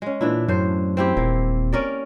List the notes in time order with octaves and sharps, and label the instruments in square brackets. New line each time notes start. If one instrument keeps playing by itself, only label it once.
[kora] G#3 C#4
[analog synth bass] A#2 [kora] E3 D4 E4
[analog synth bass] F#2 [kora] A2 C5
[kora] C4 E4 G4
[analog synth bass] D#1 [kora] A#3
[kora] C#4 A#4 D5